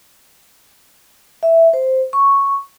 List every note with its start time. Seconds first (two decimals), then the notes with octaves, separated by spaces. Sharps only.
1.43 E5
1.73 C5
2.13 C#6